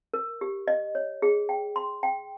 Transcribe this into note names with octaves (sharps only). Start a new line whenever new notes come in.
A#4
G4
D#5
C#5
G#4
G5
C6
G5